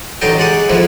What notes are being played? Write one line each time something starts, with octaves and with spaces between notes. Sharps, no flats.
A1 D3 F#3 D#4 D#5 G5
G#3 D5 F#5 D#6
F2 G#2 F3 E4